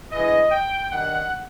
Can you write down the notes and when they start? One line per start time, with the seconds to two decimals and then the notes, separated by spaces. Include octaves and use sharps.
0.11 G2 E3 G#3 D#5
0.51 G5
0.91 G2 D#3 G3 F#5